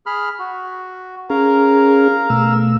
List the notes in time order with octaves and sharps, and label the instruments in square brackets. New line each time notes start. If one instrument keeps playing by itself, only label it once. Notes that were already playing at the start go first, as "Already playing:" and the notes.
[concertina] G#4 B5 F6
F#4
[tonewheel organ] C#4 G#4 [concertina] A#4 F5 A#5
[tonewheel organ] B2 A3 E6